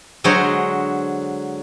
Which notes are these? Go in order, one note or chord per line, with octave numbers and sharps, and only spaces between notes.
D3 F#3 G#3 G#4 C5 C#5